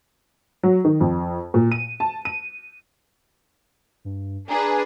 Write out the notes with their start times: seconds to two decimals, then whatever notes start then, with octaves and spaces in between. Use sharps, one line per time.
0.63 F#3
0.85 D#3
1.01 F2
1.54 A#2
1.72 D#7
2.00 A5
2.25 D#7
4.05 G2
4.49 D4 G#4 B4 A#5